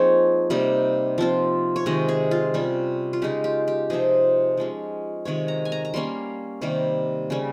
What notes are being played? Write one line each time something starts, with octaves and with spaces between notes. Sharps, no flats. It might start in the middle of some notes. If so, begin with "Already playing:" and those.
Already playing: F3 A#3 C4 D#4 G#4 C#5
C3 G3 A#3 D#4
F3 C4 F4
C#5
C3 D#3 G#3 D#5
G#4
F4
C3 G3 C#4
F4
C#3 G#3 D#4 G4
G4
G4
C3 F3 C4 D#4 G#4
F3 G#3 C#4
C3 D#3 G#3 C#5
A#5
G#5
A#5
A#5
G3 A#3 C#4 C6
C3 D#3 G3 A#3
C#3 G3 C#4